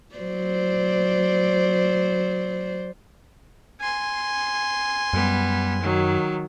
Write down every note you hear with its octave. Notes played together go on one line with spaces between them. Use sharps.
F#3 C5 D5
G#5 C6
F#2 G3 B3
D#3 F#3